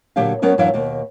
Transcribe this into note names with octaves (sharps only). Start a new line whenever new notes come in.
A#2 D3 F#3 G4 C#5 F5
F#3 B3 C#4 A#4 C5
F#2 E3 F#3 D4 E4 F5
D#2 B2 A#3